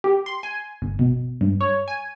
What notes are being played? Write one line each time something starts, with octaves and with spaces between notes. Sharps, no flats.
G4
C6
G#5
G1
B2
G2
C#5
G#5